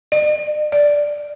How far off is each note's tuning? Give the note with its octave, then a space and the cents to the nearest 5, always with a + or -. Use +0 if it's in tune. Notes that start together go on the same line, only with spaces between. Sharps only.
D5 +45
D5 +0